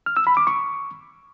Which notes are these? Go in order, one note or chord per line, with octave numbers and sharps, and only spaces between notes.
F6
E6
B5
D6
C#6